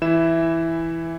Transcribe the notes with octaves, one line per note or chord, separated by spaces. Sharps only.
E3 E4 E5 E7